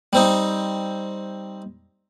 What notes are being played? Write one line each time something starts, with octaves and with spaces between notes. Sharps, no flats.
G3 C4 D#4